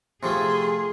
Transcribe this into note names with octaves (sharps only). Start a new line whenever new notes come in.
C3 F3 A3 G#4 C6